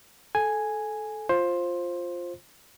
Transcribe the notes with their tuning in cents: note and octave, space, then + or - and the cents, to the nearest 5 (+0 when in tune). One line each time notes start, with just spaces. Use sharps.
A4 -15 G#5 +0
F4 +0 C5 +15